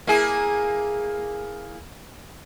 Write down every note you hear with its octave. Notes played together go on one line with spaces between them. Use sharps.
A#3 E4 G#4